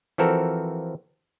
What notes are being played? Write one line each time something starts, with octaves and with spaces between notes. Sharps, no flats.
E3 F3 C4 F#4 A4 A#4